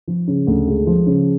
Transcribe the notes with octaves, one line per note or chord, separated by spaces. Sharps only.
F3
C#3
D2
G#3
F3
C#3